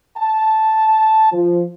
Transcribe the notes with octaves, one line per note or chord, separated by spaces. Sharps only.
A5
F3